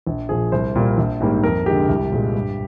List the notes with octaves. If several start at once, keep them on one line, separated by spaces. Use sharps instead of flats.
A#1
A#2 F3 G#4
C2 C5
A#2 G3 A#3
A#1
G#2 D#3 G3 A#3
F2 A#4
D3 G#3 G4
C2
A#2 G#3
G2